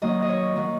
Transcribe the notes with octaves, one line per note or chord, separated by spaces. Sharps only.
D#3 F#3 A#3 D#5
D#5
C#5
D#3 F#3 A#3